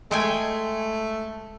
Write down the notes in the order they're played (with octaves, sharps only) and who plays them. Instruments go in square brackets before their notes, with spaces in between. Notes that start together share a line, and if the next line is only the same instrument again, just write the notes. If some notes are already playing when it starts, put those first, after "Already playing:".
[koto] G#3 G5 G#5 [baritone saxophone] A3